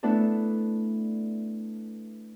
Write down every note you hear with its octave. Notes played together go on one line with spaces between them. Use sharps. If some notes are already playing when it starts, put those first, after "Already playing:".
A3 B3 D4 E4 A4